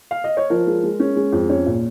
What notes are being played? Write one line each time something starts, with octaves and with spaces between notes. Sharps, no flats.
F5
D#5
C#5
F3 A#4
G#3
G#3
C#4
G#3
F2
C#4 C#5
A#2